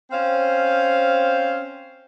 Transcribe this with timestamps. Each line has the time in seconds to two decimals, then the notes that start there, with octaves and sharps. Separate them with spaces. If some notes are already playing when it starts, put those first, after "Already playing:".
0.11 C4 C#4 C5 F5